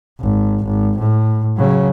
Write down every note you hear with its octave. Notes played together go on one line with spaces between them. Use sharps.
G#1
G#1
A2
C#3 F#3